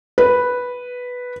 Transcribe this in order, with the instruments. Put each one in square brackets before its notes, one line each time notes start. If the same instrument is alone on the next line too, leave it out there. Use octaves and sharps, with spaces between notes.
[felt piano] B4